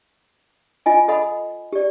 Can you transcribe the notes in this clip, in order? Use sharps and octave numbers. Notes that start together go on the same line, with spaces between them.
F4 D#5 G#5
A4 D#5 F#5 B5
G4 D5